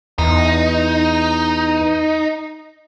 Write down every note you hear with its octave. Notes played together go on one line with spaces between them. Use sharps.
E2 D#4